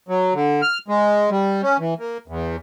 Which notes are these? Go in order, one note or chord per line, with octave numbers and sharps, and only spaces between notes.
F#3
D3
F6
G#3
G3
C#4
E3
A#3
E2